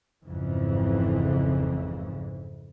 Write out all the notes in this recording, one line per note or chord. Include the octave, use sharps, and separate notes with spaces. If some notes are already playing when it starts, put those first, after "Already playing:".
G#1 F2 G#2 C#3 E3